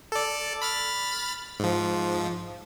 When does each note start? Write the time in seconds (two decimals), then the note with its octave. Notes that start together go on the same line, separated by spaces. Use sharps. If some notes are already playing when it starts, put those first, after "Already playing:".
0.12 A4 D5
0.62 B5 F6 A6
1.60 G#2 F3